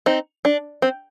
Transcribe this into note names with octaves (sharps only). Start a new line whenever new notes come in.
C4 D#4
D4
C4